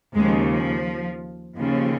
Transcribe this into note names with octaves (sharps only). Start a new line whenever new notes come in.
D#2 C#3 F3 G#3
F3
D#2 C#3 F3